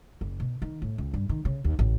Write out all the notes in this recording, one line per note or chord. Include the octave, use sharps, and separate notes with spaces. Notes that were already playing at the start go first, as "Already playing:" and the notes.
F#1
B2
D#3
A2
C#2
G2
D#3
C#3
D#2
A1